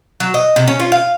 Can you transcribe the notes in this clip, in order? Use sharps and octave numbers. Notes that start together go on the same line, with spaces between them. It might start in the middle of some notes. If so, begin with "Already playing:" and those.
F#3
D#5
C3
C#4
F4
F5